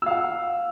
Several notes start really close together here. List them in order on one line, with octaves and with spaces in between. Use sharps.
E6 F5 F#5